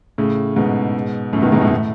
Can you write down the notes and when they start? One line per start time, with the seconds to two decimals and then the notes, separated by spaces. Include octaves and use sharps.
0.18 A2 C#3
0.56 G#2 B2
1.33 F#2 A2
1.42 B2 D#3
1.52 G#2 B2
1.61 F#2 A2
1.71 A2